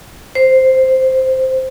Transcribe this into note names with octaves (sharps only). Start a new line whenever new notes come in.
C5